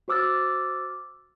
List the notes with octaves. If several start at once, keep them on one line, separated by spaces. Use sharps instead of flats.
F#4 C5 D6 E6 F6 A6